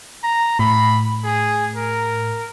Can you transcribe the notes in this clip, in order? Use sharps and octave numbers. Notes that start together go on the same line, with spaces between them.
A#5
A2 B5
G#4
A#4